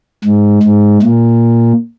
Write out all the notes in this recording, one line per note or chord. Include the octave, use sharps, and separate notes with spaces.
G#2
G#2
A#2